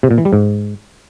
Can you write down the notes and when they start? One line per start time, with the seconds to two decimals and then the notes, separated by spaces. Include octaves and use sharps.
0.03 C3
0.11 A#2
0.18 E3
0.25 G3
0.33 G#2